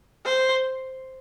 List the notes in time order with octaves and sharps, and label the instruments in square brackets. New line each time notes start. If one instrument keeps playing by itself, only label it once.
[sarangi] C5